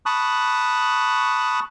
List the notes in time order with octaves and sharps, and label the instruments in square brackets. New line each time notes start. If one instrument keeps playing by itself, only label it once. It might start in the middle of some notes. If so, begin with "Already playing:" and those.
[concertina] A5 B5 C#6 D#6 F#6